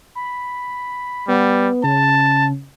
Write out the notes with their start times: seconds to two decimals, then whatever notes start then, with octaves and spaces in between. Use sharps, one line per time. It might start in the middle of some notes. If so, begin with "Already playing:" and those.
0.15 B5
1.28 G3 B3
1.84 C#3 A5